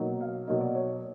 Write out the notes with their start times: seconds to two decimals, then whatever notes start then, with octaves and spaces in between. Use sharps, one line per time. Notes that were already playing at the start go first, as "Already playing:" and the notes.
Already playing: B2 F#3 A#3 D#4
0.21 F5
0.48 B2 F#3 A#3 D#4 D#5
0.61 D5
0.75 C#5